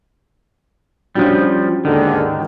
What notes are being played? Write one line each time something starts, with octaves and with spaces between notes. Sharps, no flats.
F3 G3 C#4 D4 F#4
D#2 G#2 D3 D#3